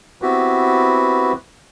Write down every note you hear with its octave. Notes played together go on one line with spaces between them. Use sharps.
B3 C4 E4 F#4 G4 B4